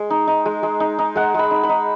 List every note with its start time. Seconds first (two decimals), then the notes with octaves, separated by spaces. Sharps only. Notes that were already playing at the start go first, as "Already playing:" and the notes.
Already playing: G#3
0.10 D#4
0.28 D#4
0.46 G#3
0.63 G#3
0.80 D#4
0.99 D#4
1.15 G#3 F#5
1.34 G#3 B5
1.51 D#4
1.63 B5
1.69 D#4